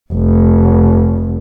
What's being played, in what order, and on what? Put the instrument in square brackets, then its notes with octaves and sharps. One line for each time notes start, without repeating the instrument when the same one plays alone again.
[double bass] F1